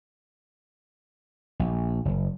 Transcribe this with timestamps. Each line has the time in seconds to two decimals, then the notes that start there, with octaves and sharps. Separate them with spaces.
1.60 A#1
2.05 F#1